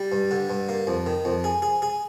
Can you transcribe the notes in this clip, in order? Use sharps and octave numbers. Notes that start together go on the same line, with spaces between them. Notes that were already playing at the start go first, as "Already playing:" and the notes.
Already playing: G3
G2
D3
G2
A#3
F2
D#3
F2
G#4
G#4
G#4